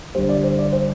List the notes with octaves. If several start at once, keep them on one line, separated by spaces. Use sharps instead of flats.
G1 G2 G3 C5
D5
C5
D5
C5